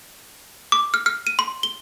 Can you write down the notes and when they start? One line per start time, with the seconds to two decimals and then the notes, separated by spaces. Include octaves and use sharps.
0.72 D6
0.94 F6
1.06 F6
1.27 D#7
1.39 C6
1.63 G7